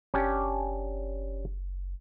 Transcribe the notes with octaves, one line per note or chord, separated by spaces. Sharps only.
F#1 C#4 D4 G4